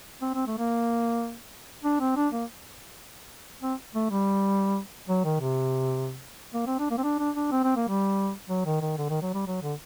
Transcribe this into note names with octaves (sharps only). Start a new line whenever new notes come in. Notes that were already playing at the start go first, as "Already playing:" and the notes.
C4
C4
A3
A#3
D4
C4
D4
A#3
C4
A3
G3
F#3
D#3
C3
A#3
C4
D4
A#3
C4
D4
D4
D4
C4
C4
A#3
G3
F#3
D#3
D#3
D3
D#3
F#3
G3
F#3
D3